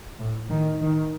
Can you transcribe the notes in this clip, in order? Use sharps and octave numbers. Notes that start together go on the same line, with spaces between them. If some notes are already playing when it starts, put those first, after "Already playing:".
A2
D#3
D#3